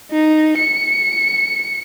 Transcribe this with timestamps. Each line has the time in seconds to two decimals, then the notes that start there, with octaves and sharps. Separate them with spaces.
0.11 D#4
0.57 C#7